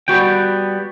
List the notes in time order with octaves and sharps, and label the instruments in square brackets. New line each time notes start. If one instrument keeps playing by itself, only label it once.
[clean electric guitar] G3 B3 F#4 G5